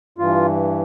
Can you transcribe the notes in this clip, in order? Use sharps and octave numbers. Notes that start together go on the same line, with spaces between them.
G2 E3 F4